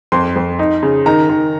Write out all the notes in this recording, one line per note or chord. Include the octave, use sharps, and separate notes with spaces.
F2 C6
F2
D#4
C#3
D#3 A#5
D#3